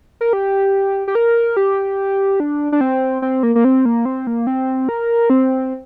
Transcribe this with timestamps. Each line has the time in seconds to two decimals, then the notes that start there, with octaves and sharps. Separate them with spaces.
0.21 A#4
0.33 G4
1.08 G4
1.15 A#4
1.57 G4
2.40 D4
2.72 D4
2.81 C4
3.22 C4
3.43 A#3
3.55 A#3
3.64 C4
3.85 A#3
4.05 C4
4.27 A#3
4.47 C4
4.89 A#4
5.30 C4